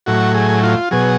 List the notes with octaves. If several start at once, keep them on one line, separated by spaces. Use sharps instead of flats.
A2 F#3 F#4
G#4
F4
B2 F#3 G#4